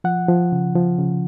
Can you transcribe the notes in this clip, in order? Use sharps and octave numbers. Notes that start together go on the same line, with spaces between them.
F3 F#5
F3
C#3
F3
C#3